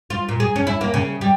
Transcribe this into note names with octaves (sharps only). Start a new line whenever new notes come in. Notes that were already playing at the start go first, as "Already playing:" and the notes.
F4
A#2
G#4
C#4
E4
A#3
C#3
G3